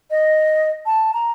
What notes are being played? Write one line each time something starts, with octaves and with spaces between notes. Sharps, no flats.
D#5
A5
A#5